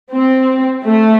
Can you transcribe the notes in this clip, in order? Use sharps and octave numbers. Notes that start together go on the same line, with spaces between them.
C4
A3